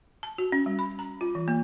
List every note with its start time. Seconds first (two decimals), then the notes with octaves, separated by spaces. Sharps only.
0.23 A5
0.38 F#4
0.52 C#4
0.66 G3
0.79 B5
0.99 A#5
1.21 F4
1.35 E3
1.48 A#3